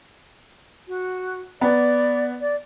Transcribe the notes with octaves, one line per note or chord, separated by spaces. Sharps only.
F#4
B3 D5
D5